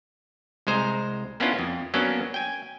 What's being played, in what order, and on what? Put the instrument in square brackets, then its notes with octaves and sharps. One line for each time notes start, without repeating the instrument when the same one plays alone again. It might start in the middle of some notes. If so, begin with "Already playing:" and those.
[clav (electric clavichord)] C2 G#3 C5 A#5
A#3 B3 C#4 D4 E4 F4
F2
F#3 A#3 B3 C#4 D4
G5 G#5